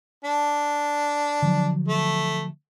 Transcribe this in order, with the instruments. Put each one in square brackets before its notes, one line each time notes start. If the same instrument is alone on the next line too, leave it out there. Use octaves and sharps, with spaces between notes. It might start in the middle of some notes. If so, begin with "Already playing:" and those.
[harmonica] D4
[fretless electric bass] D3 F3 F#3
[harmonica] A3